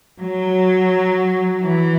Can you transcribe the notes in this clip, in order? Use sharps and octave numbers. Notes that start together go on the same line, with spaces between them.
F#3
E3